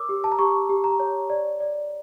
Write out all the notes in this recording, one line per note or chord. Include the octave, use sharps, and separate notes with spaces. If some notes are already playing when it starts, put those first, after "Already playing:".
Already playing: A#4 C#5 D6 E6
G4
A5
A#5
G4 C#6
G4
A#5
C#5
D5
D5